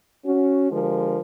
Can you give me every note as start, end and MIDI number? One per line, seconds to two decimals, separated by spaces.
0.25 0.70 61
0.25 0.70 66
0.71 1.19 50
0.71 1.19 53
0.71 1.19 56
0.71 1.19 65
0.71 1.19 67
0.71 1.19 70